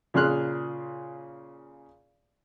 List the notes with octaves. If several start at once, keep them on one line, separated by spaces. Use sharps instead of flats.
A#2 C#3 G#4 C6 F6 F#6